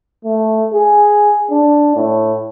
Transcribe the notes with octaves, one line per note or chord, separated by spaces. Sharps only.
A3
G#4
D4
A2